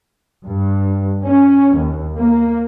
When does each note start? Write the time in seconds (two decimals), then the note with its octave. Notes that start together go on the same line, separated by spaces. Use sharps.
0.45 G2
1.23 C#4
1.76 D#2
2.17 A#3